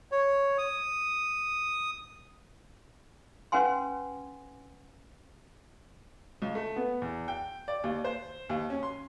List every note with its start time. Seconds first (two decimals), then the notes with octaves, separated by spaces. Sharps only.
0.12 C#5
0.58 D#6
3.52 C#4 B4 F#5 G#5 C6
6.42 C#2
6.55 A3
6.76 B3
7.02 E2
7.28 G5
7.68 D5
7.84 D#2
8.05 C5
8.49 D#2
8.70 C#4
8.83 C6